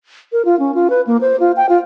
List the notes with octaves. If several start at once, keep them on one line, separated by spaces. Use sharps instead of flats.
A#4
F4
C#4
F4
B4
A#3
C5
F4
G5
F4